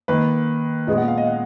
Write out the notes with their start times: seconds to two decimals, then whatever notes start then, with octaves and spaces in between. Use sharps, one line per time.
0.08 D#3 A#3 B4
0.87 A#2 G#3 B3 D#5
0.98 F#5
1.08 F5
1.18 D#5
1.27 F#5